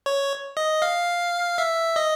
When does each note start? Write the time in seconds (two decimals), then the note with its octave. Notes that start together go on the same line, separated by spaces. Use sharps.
0.06 C#5
0.57 D#5
0.82 F5
1.58 E5
1.96 D#5